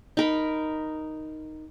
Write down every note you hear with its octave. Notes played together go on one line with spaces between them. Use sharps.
D#4 A#4 B5